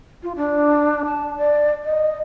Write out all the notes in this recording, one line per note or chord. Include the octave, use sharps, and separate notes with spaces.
F4
D4
A5
D5
D#5